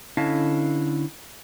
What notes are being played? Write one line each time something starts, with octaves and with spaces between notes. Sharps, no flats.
D3 C#4 E4 D#5 F5 A5